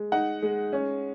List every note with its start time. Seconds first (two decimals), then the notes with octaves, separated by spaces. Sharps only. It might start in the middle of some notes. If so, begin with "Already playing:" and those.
Already playing: G#3
0.12 D#4 F#5
0.43 G#3
0.73 C#4